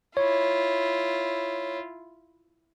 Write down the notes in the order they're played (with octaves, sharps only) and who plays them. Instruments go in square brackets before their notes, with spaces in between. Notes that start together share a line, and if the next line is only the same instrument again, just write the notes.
[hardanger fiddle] E4 F4 [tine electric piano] C#5